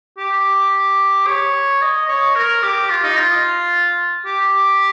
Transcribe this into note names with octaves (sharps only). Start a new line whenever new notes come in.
G4
C#5
D#5
C#5
A#4
G4
F4
D#4
F4
G4